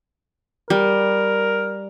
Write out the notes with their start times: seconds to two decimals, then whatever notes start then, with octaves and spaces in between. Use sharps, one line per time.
0.70 G3 A#4